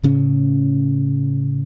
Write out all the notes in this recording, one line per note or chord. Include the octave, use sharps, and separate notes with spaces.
A2 C#3 C#4